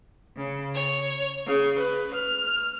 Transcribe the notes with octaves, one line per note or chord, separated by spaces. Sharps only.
C#3
C#5
C#3
B4
F6